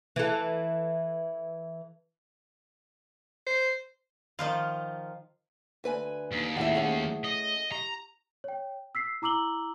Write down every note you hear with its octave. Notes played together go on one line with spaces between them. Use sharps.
E3 A4
C5
D#3 F3 F4
D2 B4 G#5
D#2
D#2 A2 E4 G#4 E5 F#5
A3 C#4 G#4 F#5
D#5
G4 A#5
C#5 G5
E6 B6 C7
E4 A#5 D6 E6 F#7 G7